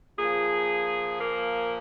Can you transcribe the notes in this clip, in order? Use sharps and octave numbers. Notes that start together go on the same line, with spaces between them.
A#2 F3 G#4
A#3